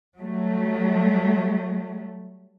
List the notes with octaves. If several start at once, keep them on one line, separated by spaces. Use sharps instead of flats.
F#3 G3 A3